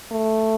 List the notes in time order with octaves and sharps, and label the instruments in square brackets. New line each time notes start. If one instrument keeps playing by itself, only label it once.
[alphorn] A3